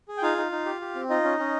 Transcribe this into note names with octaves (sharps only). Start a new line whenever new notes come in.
G#4
G5
D#4 F4 F5
D#4
D#4
G4
G4
C4
D#4 F4 D#5
C#4
C#4